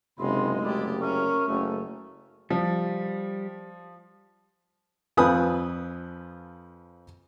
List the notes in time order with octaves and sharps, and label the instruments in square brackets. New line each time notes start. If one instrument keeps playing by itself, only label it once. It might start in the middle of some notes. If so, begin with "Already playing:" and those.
[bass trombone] F#1 [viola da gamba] C3 D#4 [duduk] G#3 [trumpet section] E5 B5 C6
[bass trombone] F#1 [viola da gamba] A3 G4 [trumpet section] D#4 E4 D5
[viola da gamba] C#4 [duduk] A#4 [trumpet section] E5 C#6
[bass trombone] F#1 [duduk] A3
[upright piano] F3 [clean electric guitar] G3
[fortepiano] F2 F3 B4 G#5 D#6